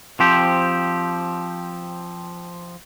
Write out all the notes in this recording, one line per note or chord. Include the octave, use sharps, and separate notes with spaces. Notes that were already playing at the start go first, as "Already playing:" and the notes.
F3 C4 G4